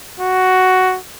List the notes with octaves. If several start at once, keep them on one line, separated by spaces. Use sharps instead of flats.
F#4